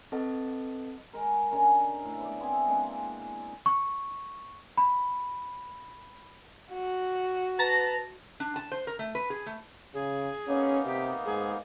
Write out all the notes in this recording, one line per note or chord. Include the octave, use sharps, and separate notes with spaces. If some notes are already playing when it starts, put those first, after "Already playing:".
C4 A4 B4 D#5 F#5 A5
G#3 A#4
D3 G#3 C#4 A#4
A2
B3 D5
B3 C4 E4 G#4
G#3 A#3 C4 D4
C#6
B5
F#4
B4 A5 A#5 A#6
D4
A5
C5
A#4
A3
B4
G#4
A3
C#3 G#4
A#3 B3 C#4 D#4
C3 G4
G#2 G#4